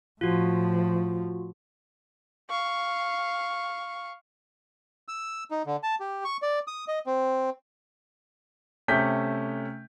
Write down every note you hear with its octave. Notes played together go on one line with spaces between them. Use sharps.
A2 F3 F4 F#4
F5 C#6
E6
D#4
D3
A5
G4
C#6
D5
D#6
D#5
C4
C3 A3 C#4 G6 B6